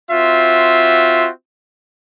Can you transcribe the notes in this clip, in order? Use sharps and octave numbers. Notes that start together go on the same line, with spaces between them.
C4 F4 F#4 E5